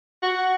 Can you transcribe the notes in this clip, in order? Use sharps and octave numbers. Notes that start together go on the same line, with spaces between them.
F#4